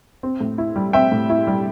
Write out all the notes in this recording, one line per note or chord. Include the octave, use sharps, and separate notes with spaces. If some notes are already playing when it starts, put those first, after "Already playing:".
C4
A2
E4
G3
C4 E5 G5
A2
E4
G3